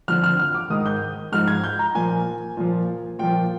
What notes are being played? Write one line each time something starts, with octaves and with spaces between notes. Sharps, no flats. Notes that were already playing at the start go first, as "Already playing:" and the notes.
F2 D3 F3 F6
F6
F6
D6
G#2 D#3 D#6
G6
G#2 F3 F6
G#6
G6
A#5
A#2 F3 G#5
A#2 F3
A#2 F3 G5